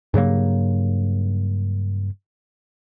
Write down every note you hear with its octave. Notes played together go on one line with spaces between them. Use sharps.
G2 C#3 F#3 A#3